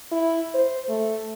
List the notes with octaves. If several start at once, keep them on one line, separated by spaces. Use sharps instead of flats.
E4
C5
A3